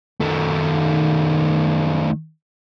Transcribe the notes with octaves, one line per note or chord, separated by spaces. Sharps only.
D#3 A3